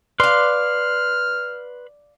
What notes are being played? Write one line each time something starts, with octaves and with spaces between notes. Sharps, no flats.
B4 D5 F5 C6 F6